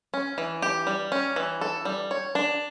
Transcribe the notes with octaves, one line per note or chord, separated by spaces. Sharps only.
C#4
E3
G4
G3
C#4
E3
A4
G3
C#5
D4